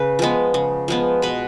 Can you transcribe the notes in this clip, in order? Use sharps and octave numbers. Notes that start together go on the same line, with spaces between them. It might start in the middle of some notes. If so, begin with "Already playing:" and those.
Already playing: C#3 B4
F3 G#3 B3
C#3
F3 G#3 B3
B2 B4